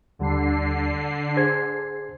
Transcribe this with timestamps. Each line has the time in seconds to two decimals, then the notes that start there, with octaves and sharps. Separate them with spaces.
0.19 D#2 D3 G3 C7
1.37 G#4 C5 G#6